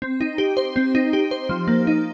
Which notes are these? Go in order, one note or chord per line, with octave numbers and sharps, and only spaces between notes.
C4
D#4
G4
C5
C4
D#4
G4
C5
F3
A#3
D#4